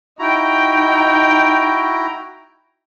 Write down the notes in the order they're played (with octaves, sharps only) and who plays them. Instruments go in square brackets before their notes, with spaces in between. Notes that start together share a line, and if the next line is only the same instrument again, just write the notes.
[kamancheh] D#4 G5 [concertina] E4 F#4 A#5